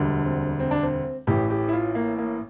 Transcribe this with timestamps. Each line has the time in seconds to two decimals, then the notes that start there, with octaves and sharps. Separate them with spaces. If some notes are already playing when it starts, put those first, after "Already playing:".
Already playing: E1 D2 D3 G3
0.25 C4
0.60 C4
0.71 D4
0.83 C4
1.27 A1 A2 E3 G4
1.50 G4
1.68 E4
1.73 F4
1.95 A#3
2.18 A#3